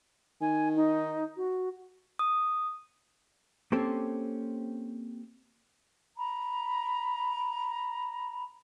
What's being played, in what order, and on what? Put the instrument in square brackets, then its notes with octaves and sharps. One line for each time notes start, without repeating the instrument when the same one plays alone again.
[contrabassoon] D#3 [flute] G#5
[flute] D#4
F#4
[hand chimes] D#6
[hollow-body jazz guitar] A#3 C4 C#4 G4 A4 C5
[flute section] A#5 B5